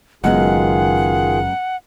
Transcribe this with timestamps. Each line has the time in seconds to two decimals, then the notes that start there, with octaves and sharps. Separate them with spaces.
0.24 F#1 F#2 D#3 G#3 B3 F4 G#4 F#5